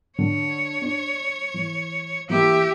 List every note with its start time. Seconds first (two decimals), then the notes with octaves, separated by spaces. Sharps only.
0.19 D3 C#5
0.82 D4
1.54 E3
2.30 E3 A#3 E4 G4 E5